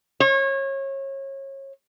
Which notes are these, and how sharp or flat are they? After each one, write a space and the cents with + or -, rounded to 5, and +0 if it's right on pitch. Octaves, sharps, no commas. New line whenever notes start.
C#5 -30